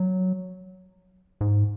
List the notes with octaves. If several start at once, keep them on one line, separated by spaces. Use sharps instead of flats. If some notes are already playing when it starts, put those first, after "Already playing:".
Already playing: F#3
G#2